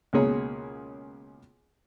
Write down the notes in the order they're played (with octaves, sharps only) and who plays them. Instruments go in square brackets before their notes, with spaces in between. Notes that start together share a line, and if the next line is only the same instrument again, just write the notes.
[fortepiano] C#2 B2 A#3 G#4 C#5